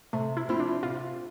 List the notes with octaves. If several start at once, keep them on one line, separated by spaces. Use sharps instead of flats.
C3 A3
E4
F3 C4 E4 F4
D4
C3 F4